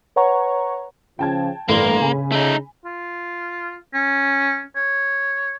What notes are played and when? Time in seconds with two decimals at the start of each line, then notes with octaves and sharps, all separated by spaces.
0.16 B4 C#5 F#5 A#5 C#6
1.19 C#3 F3 G5 A5 G#6
1.68 G1 A2 E3 G3 A#3 C6
2.00 C#3 G#5 B5
2.32 A3 D#4
2.85 F4
3.94 C#4
4.76 C#5